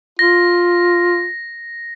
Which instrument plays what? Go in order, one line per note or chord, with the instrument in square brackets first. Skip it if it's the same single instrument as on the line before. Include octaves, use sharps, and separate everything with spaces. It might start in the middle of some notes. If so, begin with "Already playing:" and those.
[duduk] F4 [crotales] A#6